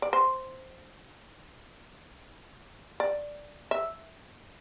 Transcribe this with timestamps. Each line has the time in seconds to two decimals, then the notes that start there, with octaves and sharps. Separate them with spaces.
0.02 D5
0.13 C5
3.00 D5
3.71 E5